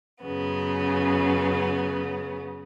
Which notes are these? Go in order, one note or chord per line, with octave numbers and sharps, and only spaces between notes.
F#2 C#3 B3